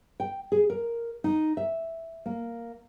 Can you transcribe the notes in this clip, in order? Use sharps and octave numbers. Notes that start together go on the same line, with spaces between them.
G5
G#4
A#4
D#4
E5
A#3